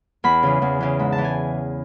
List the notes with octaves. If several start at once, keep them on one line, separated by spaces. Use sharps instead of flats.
E2 B5
C#3 E3
E2
C#3 E3
G#2 B5
A5
E3
G#5